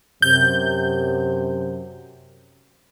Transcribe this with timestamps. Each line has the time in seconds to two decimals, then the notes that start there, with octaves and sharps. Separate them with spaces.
0.22 F#2 C3 G6